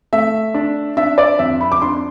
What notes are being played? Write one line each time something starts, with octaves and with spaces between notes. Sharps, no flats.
A3 E5
D4
D4 E5
D5
F2 E5
B5
D6
D4 C6